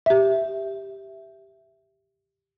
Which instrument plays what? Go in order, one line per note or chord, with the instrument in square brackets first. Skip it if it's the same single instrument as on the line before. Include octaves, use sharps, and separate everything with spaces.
[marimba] G4 E5